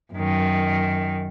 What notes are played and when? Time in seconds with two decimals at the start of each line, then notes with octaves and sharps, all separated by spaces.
0.13 F#2 D#3